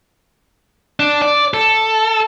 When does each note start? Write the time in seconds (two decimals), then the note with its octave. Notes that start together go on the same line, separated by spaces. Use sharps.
1.00 D4
1.22 D5
1.54 A4